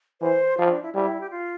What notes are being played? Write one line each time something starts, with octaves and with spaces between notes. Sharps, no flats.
E3 C5
F3 F4
D4
E4
G3 E4
G4
F4